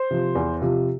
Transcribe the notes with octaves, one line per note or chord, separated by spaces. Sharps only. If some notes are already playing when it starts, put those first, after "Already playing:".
Already playing: C5
C3 F3
E2
C3 F3